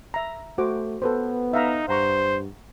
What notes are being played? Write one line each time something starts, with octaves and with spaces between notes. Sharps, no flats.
E5 A#5
A3 F#4 C5 D6
B3 A4 B4 C5
D#4 E5 F5 A#5
G2 C5 F#5 A#5 C#6